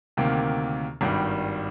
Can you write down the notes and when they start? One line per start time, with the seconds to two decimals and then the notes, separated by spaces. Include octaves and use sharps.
0.17 D2 C3 D#3 A#3
1.01 G#1 G2 D#3 G3